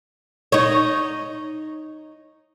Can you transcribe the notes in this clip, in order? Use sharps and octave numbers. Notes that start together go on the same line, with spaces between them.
D#4 C#5